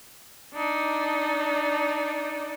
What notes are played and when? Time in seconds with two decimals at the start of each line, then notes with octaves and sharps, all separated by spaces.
0.54 D4 D#4